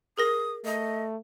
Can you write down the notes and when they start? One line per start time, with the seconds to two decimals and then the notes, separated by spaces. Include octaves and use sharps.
0.18 G#4 A#4 D#6 A#6
0.65 A3 D#5